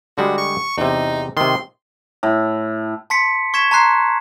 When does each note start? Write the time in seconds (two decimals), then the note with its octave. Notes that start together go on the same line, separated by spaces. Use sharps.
0.18 D3 G3 G#3 F#4
0.38 C#6
0.78 E2 C3 D#4
1.37 C3 D#3 C6
2.23 A2
3.10 A5 C6 B6 C#7
3.54 C#6 G#6 B6 E7
3.71 A5 A#5 C6 F#6 C7